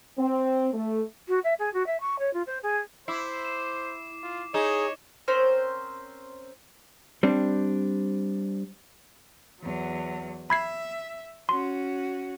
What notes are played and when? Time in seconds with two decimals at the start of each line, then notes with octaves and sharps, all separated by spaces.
0.19 C4
0.73 A3
1.28 F#4
1.44 E5
1.59 G#4
1.73 F#4
1.86 E5
2.00 C#6
2.19 C#5
2.33 F4
2.46 C5
2.62 G#4
3.08 E4 C5 D6 C7
3.45 E7
4.23 F4
4.54 D#4 G#4 C#5 E7 G7
5.28 C4 C#4 A#4 C5
7.23 G3 C4 D4
9.60 E2 F#3
10.50 E5 B5 G#6 C7
11.49 C#4 F#4 C6